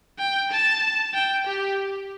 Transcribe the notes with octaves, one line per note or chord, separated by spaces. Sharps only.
G5
A5
G5
G4